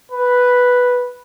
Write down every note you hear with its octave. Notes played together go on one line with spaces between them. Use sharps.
B4